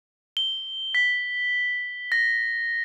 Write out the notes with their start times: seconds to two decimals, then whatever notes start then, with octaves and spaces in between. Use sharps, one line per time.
0.37 G7
0.95 B6
2.12 A#6